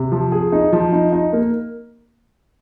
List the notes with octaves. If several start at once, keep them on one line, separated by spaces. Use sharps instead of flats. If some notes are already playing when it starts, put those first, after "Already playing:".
Already playing: C3
F3
G#4
D#4
F3
D#4
D#4
A#3